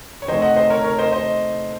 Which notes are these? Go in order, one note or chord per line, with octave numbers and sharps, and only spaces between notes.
C#5
C3 D#3 A3 C5 D#5
D#5 F#5
C5 D#5
A#4 C#5
A#4 C#5
C5 D#5
C5 D#5